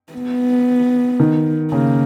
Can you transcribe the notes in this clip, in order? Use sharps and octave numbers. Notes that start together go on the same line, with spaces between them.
B3
D#3
C#3 A#3